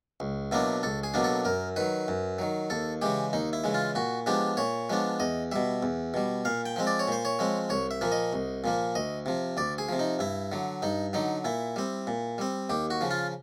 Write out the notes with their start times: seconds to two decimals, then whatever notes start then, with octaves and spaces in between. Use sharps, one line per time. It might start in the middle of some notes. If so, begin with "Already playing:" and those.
0.20 C#2
0.51 B2 F#3 A#3 D4 E4
0.83 C#2 A4
1.03 G#4
1.14 B2 F#3 A#3 D4
1.24 A4
1.45 F#2 A#4
1.76 D#3 F#3 B4
2.08 F#2
2.39 D#3 F#3
2.70 D#2 A4
3.02 C#3 E3 G#3 G4
3.33 D#2 D#4
3.53 E4
3.64 C#3 E3 G#3
3.74 F4
3.95 A#2 F#4
4.26 F3 G#3 B3 D4 G4
4.57 A#2 C#5
4.90 F3 G#3 B3 D4
5.20 E2 D#5
5.52 B2 G3 E5
5.83 E2
6.14 B2 G3
6.45 A#2 F5
6.66 G5
6.76 F3 G#3 C4
6.87 D5
6.99 C#5
7.08 A#2 C5
7.25 C#5
7.39 F3 G#3 C4
7.69 C2 C#5
7.91 E5
8.01 A#2 F3 A#3
8.12 D#5
8.33 C2
8.64 A#2 F3 A#3
8.95 D2 D#5
9.26 C3 F3
9.57 D2 D5
9.78 G#4
9.89 C3 F3
9.99 D#4
10.19 G2 E4
10.52 D3 F#3
10.82 G2 D#4
11.13 D3 F#3 D#4
11.45 A#2 E4
11.76 G3 C4
12.07 A#2
12.38 G3 C4
12.69 D#2 G4
12.90 F#4
13.01 C#3 F3
13.11 F4